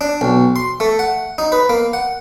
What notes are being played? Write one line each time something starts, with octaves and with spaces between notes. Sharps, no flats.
D4
B1
C6
A3
F#5
D#4
B4
A#3
F#5